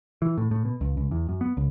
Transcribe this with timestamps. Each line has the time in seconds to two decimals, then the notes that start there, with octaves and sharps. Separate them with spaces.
0.22 E3
0.38 A2
0.51 A2
0.65 B2
0.81 C#2
0.97 C#2
1.11 E2
1.29 F#2
1.41 B3
1.57 C#2